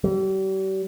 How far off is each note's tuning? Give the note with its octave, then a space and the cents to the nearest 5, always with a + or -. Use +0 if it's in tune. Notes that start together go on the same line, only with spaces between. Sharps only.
G3 -40